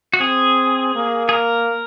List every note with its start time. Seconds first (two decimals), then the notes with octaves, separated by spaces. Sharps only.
0.14 F#4
0.20 C4 G#4
0.95 A#3
1.29 G#4
1.33 A#4